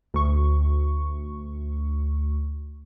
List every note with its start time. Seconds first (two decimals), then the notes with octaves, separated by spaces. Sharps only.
0.14 D2 C#6